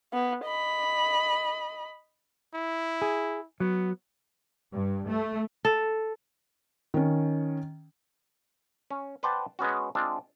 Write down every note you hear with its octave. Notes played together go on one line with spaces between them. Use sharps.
B3
D#5 B5
E4
G#4
F#3 B3
G2
A3
A4
D#3 C#4
C#4
B4 C5 D5 F#5 G5 A5
G#3 B3 C#4 F#4
G#3 C4 D4 F4